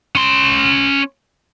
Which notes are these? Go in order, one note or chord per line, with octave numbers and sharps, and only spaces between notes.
C#4 C6